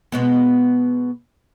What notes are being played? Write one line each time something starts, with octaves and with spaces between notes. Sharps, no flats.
B2 G#3 B3